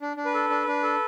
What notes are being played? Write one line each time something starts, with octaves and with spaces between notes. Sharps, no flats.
D4
D4
B4
A4
D4
D4
A4